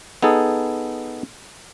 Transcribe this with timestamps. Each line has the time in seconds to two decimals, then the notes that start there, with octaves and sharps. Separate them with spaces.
0.23 B3 D#4 G#4 A4